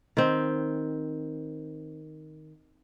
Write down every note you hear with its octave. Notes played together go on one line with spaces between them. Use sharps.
D#3 C4